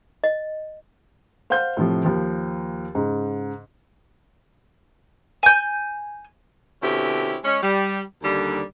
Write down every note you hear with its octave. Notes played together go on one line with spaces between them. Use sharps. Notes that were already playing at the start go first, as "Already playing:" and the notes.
D#5
C5 F5 F#5 C6 G6
A2 C3 F3
D#2 F3
G#2 C#3
G#5 G6
B2 D3 C4 C#4 E4 G4
G#3 C#4
G3
D#2 D3 G3